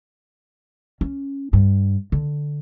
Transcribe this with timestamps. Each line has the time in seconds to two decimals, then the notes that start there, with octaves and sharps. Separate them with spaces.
1.01 C#4
1.53 G2
2.12 D3